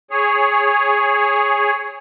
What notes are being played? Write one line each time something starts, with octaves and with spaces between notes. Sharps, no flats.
G#4 C#5